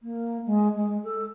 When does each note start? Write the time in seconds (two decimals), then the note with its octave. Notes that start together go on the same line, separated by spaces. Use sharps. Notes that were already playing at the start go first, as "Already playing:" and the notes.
0.01 A#3
0.45 G#3
0.75 G#3
1.03 A4